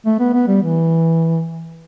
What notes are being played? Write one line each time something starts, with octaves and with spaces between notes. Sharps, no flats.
A3
B3
B3
G3
E3